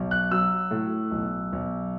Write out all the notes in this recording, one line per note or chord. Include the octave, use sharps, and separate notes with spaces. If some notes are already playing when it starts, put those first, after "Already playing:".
Already playing: B1
F#6
F#3 E6
A2
B1
B1